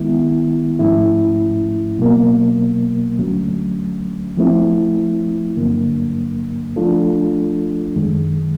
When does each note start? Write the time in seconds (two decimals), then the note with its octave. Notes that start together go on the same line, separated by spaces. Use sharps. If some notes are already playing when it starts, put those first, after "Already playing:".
Already playing: D#3 G#3 B3 E4
0.79 G#2 F3 A3 C#4 E4
1.98 B2 F#3 A#3
3.17 D2 D3 F#3 A3 C#4
4.37 F3 A3 C4 E4
5.57 G2 D3 F#3 A#3
6.76 F3 A3 D4 F4 A4
7.96 F#2 D#3 G#3